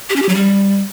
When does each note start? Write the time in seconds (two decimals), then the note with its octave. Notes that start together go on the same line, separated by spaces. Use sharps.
0.10 G4
0.16 C#4
0.22 G4
0.29 F#3
0.35 G3